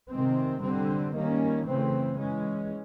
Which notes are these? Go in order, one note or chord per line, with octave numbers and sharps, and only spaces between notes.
C3 D#3 G#3 C4
D3 G3 C4
D#3 G3 A#3 C#4
C#3 E3 A3 C4
E3 G#3 C#4